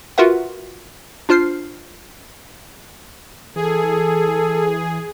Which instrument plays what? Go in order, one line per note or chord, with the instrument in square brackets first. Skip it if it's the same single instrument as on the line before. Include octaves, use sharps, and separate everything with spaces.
[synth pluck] F4 F#4 A#4 B4 E5 F#5
D4 F4 C5 F6 C7
[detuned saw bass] E3 [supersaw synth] G#4 [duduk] A4